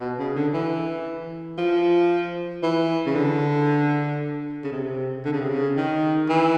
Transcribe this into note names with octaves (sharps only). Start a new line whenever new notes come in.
B2
C#3
D3
E3
F3
E3
C#3
D3
C#3
C3
D3
C#3
C3
C#3
D#3
E3